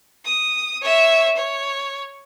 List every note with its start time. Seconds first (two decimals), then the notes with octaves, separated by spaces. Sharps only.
0.25 D#6
0.82 C#5 E5
1.36 C#5